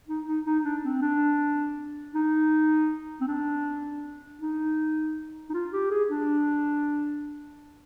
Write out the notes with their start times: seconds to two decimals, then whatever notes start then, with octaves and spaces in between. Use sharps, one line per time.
0.08 D#4
0.27 D#4
0.46 D#4
0.64 D4
0.84 C4
1.02 D4
2.15 D#4
3.21 C4
3.27 D4
4.41 D#4
5.50 D#4
5.54 F4
5.73 G4
5.91 G#4
6.10 D4